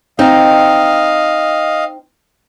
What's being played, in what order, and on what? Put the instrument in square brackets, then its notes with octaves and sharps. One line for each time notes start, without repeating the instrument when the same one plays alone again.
[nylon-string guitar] C4 D#4 [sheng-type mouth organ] D#5 F5